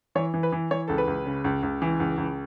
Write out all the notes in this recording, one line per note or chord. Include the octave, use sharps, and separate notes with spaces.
E3 C#5
E3
B4
E3
E3 C#5
C#2 A4
B4
C#2
C#3
C#2
C#2
E3
C#2
C#2